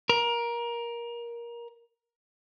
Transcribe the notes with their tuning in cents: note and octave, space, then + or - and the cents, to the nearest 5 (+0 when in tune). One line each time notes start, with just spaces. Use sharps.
A#4 +20